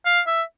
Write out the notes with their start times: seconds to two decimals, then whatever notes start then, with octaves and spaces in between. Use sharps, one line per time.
0.06 F5
0.27 E5